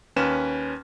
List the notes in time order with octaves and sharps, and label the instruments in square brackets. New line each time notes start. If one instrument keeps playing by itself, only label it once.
[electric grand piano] D#2 C#4 B4 F6 E7